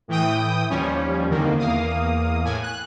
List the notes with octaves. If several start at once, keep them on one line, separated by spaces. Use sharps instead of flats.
A2 E3 G5 D#6
D#2 F3 G3 C#4
C2 F2 D3 D#3 A#3
E2 A#3 F5 D#6
A2 G#5
F#6